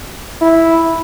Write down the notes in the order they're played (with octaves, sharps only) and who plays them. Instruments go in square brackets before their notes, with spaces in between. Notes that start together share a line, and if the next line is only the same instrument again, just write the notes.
[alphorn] E4